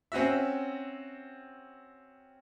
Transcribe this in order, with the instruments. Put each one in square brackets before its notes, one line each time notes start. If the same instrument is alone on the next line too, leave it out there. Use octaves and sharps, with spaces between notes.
[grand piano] C4 C#4 F#4 E5